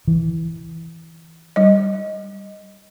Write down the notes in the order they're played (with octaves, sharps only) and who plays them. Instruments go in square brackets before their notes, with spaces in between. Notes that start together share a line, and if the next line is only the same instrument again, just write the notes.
[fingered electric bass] E3
[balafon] G3 D#5